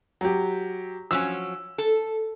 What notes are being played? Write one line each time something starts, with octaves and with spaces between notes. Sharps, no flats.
F#3 G4
F3 F#3 C#4 E6
A4